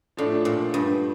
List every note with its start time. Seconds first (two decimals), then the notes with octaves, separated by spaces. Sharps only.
0.17 A2 F3 A3 D4
0.45 A#2
0.74 G2